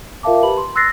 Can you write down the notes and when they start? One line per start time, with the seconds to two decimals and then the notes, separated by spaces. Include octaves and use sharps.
0.23 F4 A#4 E5 F5 A5 D6
0.43 G4 B4 A5 B5 F#7
0.57 C6
0.75 C6 E6 F#6 A6 A#6 C7